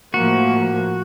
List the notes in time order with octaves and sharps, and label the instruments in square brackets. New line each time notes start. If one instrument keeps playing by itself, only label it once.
[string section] A2 F3 A#3 [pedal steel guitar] F#4